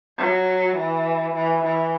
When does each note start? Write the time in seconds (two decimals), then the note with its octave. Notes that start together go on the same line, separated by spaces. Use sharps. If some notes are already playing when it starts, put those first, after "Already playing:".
0.18 F#3
0.76 E3
1.34 E3
1.64 E3